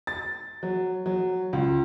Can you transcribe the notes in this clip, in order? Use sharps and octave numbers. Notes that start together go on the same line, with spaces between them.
A6
F#3
F#3
C#2